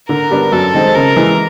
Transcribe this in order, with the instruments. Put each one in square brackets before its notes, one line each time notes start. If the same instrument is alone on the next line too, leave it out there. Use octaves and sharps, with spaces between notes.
[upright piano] D3 [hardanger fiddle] A#4
[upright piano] G3 B3 D4
[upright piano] F#2 [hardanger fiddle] A4
[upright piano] D#3 G#3 C4
[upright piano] C#3 [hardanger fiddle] A#4
[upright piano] E3 G#3